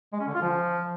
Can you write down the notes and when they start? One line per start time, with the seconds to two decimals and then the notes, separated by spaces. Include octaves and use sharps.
0.13 G#3
0.20 C#4
0.27 D3
0.35 F4
0.42 F3